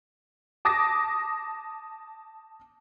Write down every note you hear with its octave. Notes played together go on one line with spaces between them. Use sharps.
A5 D6 D#6 A#6